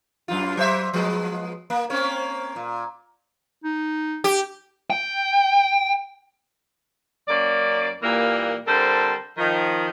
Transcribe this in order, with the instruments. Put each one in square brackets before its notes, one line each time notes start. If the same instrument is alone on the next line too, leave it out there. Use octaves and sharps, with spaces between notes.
[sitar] F#2 F#3 F4
F#3 C5 E5
F3 G#3 B3
A#3
A#3 C4 C#4
A#2
[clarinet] D#4
[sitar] G4
[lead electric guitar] G5
[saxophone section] F#2 A#3 C#4 D5
A#2 E3 G3 A#3
D3 G3 C4 A4 A#4 C5
D#3 F3